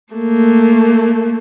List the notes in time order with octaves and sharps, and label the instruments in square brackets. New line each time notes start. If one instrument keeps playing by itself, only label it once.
[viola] A3 A#3